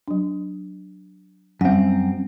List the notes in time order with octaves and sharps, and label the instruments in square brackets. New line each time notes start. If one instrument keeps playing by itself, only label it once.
[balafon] F#3 D4
[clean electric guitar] F#2 C4 [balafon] G3 F#5